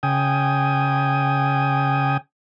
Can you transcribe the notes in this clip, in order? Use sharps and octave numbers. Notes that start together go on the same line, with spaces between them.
C#3 G5 G#5 D#6